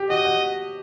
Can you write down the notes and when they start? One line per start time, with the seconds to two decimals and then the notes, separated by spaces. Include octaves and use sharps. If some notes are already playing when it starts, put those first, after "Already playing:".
Already playing: G4
0.10 F#4 D#5
0.25 F#4